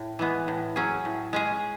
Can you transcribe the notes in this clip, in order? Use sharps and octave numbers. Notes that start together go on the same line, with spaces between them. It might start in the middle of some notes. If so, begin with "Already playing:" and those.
Already playing: A2
E3 G#3 B3
A2
F#3 C#4 G#4
A2
G#3 C#4 G#4